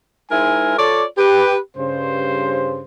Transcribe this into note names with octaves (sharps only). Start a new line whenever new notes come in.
G#3 D#4 E4 A#4 C5 G#5
F4 A4 C#5 D5
G4 B4
G2 C#3 C5